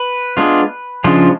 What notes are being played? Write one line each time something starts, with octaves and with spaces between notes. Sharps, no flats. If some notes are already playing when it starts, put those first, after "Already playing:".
Already playing: B4
G#3 B3 D4 F4
C#3 F3 G#3 D4 F4